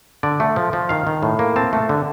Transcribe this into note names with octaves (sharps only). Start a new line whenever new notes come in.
D3 D5
A3
F3
F3
D#3 F5
D#3
A2
A#3
C4 A5
A3
D3